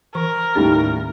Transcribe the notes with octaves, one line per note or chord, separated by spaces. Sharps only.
E3 A#4 C#6
D#2 A2 G3 C#4 D#4